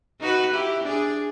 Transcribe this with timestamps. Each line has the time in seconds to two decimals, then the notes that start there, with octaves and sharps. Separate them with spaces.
0.20 D#4 F#4 B4
0.52 E4 G4
0.84 D4 G#4